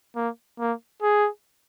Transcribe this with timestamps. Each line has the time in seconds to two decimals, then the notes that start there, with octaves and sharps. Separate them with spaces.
0.16 A#3
0.59 A#3
1.02 G#4